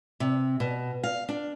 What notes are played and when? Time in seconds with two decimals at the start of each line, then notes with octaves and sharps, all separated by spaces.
0.20 C3
0.60 B2
1.04 F5
1.29 D4